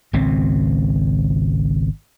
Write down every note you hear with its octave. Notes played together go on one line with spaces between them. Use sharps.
G#1 C#2 B2 C4